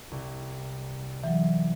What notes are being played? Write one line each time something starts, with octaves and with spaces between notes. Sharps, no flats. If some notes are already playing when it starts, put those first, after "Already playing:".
C2
E3 F#3